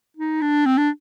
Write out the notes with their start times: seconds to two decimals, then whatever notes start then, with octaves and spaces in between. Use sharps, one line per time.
0.17 D#4
0.42 D4
0.66 C4
0.78 D4